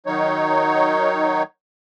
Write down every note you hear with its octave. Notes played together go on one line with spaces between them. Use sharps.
D#3 F#3 D#4 C#5